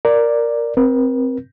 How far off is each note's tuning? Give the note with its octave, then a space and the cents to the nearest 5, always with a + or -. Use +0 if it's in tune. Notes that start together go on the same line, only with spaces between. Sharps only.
A#4 +0 D5 +0
C4 +0 A#4 +40